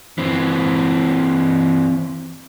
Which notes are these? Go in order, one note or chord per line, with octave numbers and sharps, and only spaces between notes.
E3 C4